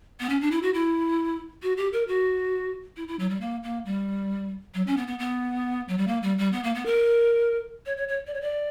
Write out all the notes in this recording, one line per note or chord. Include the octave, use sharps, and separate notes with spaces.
B3
C#4
D4
E4
F#4
E4
F#4
G4
A#4
F#4
E4
E4
F#3
G3
A#3
A#3
G3
F#3
C#4
B3
B3
B3
F#3
G3
A#3
G3
G3
B3
A#3
B3
A#4
C#5
C#5
C#5
D5
C#5
D5